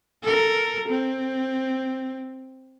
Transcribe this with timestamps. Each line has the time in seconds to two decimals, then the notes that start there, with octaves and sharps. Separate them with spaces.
0.23 A4 A#4
0.89 C4